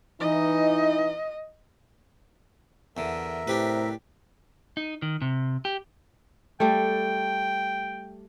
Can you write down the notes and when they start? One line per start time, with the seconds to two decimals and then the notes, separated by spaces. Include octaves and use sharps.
0.20 E3 D#4 D#5
2.97 E2 D3 A#4 E5
3.47 A2 C3 D4 G4 B4
4.77 D#4
5.02 D#3
5.22 C3
5.65 G4
6.60 G3 A3 G5